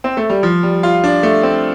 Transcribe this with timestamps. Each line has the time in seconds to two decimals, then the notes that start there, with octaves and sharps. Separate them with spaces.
0.04 C4
0.17 A3
0.30 G3
0.43 F3
0.63 G3
0.83 F4
1.04 D4
1.23 A3
1.43 C4